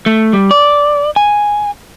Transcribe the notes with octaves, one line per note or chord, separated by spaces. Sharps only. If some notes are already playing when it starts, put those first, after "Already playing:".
A3
G3
D5
G#5